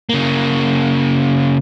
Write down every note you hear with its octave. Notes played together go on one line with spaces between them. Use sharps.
C#3 A#3